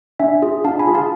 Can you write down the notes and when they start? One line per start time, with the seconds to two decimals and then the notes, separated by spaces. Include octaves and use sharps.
0.19 D4 E5 G#5
0.42 F4 G#4
0.64 D4 F5 A5
0.79 G#5 B5
0.87 F4 G#4
0.94 F5 A5